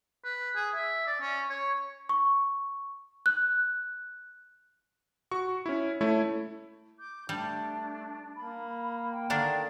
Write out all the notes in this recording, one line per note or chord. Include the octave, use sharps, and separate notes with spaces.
B4
G#4
E5
D5
C#4
C#5
C#6
F#6
F#4 C#6
C#4 E4
A3 E4 C#5
D6 G6
G3 A3 D4
A#3 B5
G5
D3 D#3 A#3 D4 D5